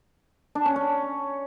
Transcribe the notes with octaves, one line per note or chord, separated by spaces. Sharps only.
D4
C#4
C#4